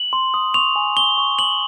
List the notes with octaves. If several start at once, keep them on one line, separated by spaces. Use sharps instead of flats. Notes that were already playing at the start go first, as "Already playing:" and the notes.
Already playing: F#7
C6
D#6
C#6 F7
G#5
C#6 G7
C#6
D#6 F#7